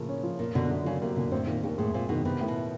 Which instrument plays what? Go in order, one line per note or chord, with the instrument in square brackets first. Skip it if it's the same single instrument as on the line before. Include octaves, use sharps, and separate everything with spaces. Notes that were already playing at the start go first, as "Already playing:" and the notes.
Already playing: [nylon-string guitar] A2 [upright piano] C#3 F3 A#3
[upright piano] C#4
F3
[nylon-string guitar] A#2 [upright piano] A#3
[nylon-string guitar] B2 [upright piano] D3
[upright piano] F#2
[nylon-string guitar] C#3 [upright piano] F#3
[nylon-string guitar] C3 [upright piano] A#3
[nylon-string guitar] A#2 [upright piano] D3
[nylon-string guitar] A2 [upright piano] C4
[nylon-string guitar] A#2 [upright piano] D#3
[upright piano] D#2 [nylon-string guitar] A#2
[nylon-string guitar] A2 [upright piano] G#3
[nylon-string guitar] A#2 [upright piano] C4
[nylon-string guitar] B2 [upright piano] D#3
[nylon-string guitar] C3 [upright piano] B3
[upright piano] A2
[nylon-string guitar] B2